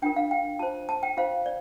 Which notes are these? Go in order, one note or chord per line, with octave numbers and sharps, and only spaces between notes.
D4 F4 A#4 G5
F5
G5
F4 C5 A5
A5
G5
F4 C5 F5
D5